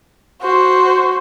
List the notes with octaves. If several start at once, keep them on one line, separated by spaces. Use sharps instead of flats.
F#4 C5